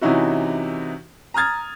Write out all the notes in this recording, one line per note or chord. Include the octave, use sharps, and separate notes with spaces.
C3 E3 C#4 D#4 E4 F#4
A#5 D#6 F6 G#6 A6